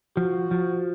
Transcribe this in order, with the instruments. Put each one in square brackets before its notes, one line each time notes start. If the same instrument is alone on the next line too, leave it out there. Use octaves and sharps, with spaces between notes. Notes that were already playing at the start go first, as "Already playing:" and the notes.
[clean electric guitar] F3 [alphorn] F#4
[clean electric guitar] F3